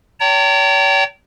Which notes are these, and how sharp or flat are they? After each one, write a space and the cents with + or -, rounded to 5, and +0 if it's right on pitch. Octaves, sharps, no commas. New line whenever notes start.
C#5 +40 G5 -25 A#5 -40